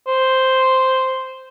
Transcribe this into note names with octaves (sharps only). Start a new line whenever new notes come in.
C5